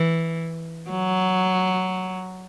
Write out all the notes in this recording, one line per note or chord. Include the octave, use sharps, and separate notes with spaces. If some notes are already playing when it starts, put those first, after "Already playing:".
Already playing: E3
F#3